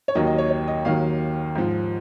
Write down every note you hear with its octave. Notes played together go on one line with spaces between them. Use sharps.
C#5
D#2 D#3 F#3 D#5
D#5
C#5
C#5
D#5
D#2 D#3 F#3 F5
G#2 F3